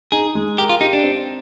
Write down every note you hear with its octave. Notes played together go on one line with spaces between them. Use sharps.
D#4 G#4
G#3
G4 A#4
F4
D#4 G4
D4
C4